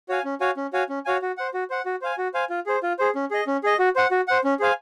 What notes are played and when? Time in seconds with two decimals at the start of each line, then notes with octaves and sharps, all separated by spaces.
0.09 F#4 C#5 F5 G#5
0.25 C#4
0.41 F#4 C#5 F5 G#5
0.57 C#4
0.73 F#4 C#5 F5 G#5
0.89 C#4
1.05 F#4 C#5 F5 G#5
1.22 F#4
1.37 C5 F#5
1.54 F#4
1.70 C5 F#5
1.86 F#4
2.02 C5 F5 G#5
2.18 F#4
2.34 C5 F5 G#5
2.50 F4
2.66 G#4 C5
2.83 F4
2.99 G#4 C5
3.15 C#4
3.31 G#4 D#5
3.47 C#4
3.63 G#4 D#5
3.79 F#4
3.96 C5 F#5
4.11 F#4
4.28 C5 F#5
4.44 C#4
4.60 G#4 C5 F5 G#5